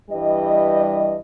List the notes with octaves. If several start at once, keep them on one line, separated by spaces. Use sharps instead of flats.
G2 E3 G3 D#5